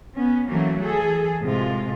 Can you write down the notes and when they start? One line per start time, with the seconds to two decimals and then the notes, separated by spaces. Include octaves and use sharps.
0.15 B3 C#4
0.49 E3 F#3 A3 A#3 C#4
0.82 E3 G#4 A4
1.40 A2 C3 G#3 F4